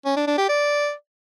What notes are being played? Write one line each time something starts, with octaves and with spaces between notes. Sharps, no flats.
C#4
D4
D4
G4
D5